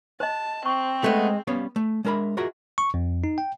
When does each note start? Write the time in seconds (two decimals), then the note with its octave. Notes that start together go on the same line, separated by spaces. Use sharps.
0.20 C5 D#5 A5
0.66 C4 C#6
1.04 G#3 A3 B3
1.47 G3 B3 C#4 C#5 F5
1.76 A3
2.05 G#3 D4 A#4 E5 B5
2.37 F4 F#4 G#4 A#4 D#5 E5
2.78 C#6
2.94 F2
3.24 D#4
3.38 G5